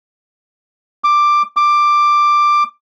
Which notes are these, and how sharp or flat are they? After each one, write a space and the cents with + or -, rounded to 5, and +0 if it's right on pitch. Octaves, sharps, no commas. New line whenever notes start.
D6 +10
D6 +10